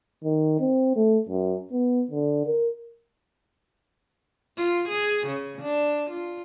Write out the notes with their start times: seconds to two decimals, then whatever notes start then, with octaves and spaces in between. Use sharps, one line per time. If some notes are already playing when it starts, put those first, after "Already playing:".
0.24 D#3
0.60 C4
0.96 A3
1.29 F#2
1.72 B3
2.11 D3
2.46 A#4
4.57 F4
4.88 G#4
5.27 C#3
5.61 D4
6.10 F4